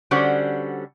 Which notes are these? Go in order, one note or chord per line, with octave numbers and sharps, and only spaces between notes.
D3 G3 C#4 F#4 C5 F#5